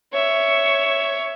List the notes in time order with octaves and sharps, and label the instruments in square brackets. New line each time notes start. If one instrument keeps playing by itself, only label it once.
[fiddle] C#5 E5